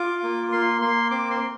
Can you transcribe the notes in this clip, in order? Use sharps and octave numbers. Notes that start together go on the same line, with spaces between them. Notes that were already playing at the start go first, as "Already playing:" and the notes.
Already playing: F4 D6
A#3
A#3 C6
A#3 C6
C4 D6
C6
C4